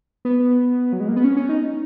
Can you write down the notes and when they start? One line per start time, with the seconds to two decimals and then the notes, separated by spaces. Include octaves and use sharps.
0.25 B3
0.93 F#3
1.00 G#3
1.08 A#3
1.16 B3
1.24 C#4
1.37 C#4
1.49 D#4